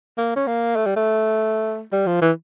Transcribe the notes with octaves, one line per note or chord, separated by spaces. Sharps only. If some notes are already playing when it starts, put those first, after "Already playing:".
A#3
C#4
A#3
A3
G3
A3
G3
F3
E3